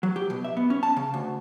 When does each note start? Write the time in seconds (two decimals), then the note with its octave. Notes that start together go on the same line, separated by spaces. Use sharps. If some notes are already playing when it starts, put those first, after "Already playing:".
0.03 F#3
0.16 G4
0.30 B2
0.44 E5
0.57 B3
0.70 C#4
0.83 A5
0.97 C#3
1.14 D2